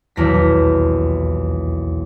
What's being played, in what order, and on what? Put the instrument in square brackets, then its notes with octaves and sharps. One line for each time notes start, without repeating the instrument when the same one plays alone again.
[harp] D#1 B1 E2 A#6 B6